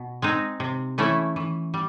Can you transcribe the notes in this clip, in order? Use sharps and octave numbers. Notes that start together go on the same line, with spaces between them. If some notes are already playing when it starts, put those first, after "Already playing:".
Already playing: B2
G#3 C4 D#4
C3
E3 A3 C#4 E4
E3
G3